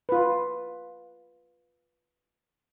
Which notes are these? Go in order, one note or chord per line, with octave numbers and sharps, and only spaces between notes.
F4 B4